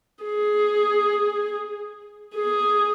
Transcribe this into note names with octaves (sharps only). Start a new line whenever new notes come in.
G#4
G#4